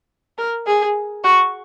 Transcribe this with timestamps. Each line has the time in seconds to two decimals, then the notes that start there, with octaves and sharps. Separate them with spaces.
0.38 A#4
0.67 G#4
1.24 F#4